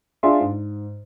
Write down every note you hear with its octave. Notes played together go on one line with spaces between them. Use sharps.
D4 F4 G#4 D5 E5 C6
G#2